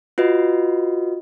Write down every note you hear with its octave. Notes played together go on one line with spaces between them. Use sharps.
F4 F#4 B4 D#5